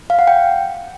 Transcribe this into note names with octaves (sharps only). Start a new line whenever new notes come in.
F5
F#5
G5